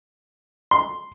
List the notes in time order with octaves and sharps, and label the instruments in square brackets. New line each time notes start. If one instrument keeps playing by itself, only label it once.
[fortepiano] C6